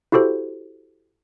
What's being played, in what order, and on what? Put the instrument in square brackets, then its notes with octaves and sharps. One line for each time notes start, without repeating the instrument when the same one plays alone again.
[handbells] E4 F#4 G4 A4 C5